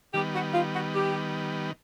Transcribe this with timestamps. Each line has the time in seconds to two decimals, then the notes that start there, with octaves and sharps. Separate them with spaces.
0.14 D#3 G3 B3 G4
0.34 F#4
0.54 F4
0.74 F#4
0.94 G4